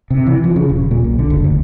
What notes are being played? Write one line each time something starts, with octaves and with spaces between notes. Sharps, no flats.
C3
E3
F3
C#3
D#1
A#2
B1
D3
F#1
D2